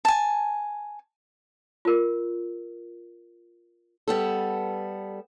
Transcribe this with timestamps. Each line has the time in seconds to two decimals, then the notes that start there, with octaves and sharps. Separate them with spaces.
0.05 G#5 A5
1.85 F4 A#4
4.08 G3 B3 A4